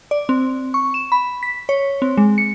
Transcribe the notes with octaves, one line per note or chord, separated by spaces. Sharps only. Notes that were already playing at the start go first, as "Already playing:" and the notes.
D5
C4
C#6
E7
B5
B6
C#5
C4
G#3
C#7